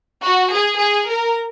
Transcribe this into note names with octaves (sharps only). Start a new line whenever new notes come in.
F#4
G#4
G#4
A#4